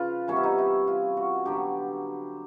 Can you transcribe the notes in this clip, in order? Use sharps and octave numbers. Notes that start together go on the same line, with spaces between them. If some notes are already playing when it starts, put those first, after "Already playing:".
Already playing: C#3 F3 F4 B4
C3 E3 G3 B3 C#4
E4
D#4
E4
F4
F#4
D3 F#3 B3 G4